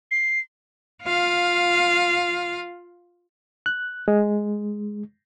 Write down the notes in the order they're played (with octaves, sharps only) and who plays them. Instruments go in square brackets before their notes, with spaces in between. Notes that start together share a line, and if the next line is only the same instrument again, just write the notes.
[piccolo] C7
[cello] F4 F5
[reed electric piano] F#6
G#3